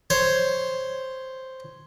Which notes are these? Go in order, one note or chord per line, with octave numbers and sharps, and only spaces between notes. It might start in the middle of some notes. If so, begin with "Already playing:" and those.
C5 C#5